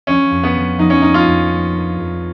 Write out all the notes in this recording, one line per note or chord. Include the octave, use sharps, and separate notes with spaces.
F3 C#4
F2
B3
F3
F3 D#4
C#4
A#3 D#4
F4
F2
A#3
A#3
F2